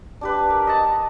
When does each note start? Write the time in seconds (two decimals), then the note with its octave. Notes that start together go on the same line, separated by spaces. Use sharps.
0.21 D4 G4 B4
0.50 A#4
0.67 D#5 F#5 A5 B5